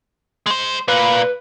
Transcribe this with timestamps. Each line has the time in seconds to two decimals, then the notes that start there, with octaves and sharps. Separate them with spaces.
0.46 G#3 C5
0.88 A#2 F4 B4